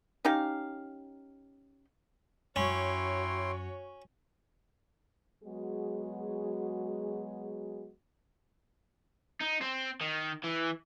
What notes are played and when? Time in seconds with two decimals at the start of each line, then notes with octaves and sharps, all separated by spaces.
0.25 C#4 D#4 G4 F5
2.56 F#2 C#4 E4 F#4 C#5 G5 C6
5.43 F#3 G#3 B3 F#4 G#4
9.40 D#4
9.61 C4
10.01 D#3
10.44 E3